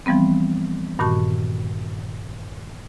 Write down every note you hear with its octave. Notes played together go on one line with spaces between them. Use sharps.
E3 F3 G3 B3 C4
G2 A#2 D#3 F#4 A5 C#6